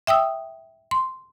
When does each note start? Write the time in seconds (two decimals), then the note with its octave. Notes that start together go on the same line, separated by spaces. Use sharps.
0.07 E5 G5 D#6 E6
0.91 C6